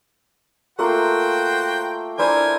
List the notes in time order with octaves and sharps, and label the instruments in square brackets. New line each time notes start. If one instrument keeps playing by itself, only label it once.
[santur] A3 A#3 F4 [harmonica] F#4 C5 G5
[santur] D4 E4 C5 [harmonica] A#4 G#5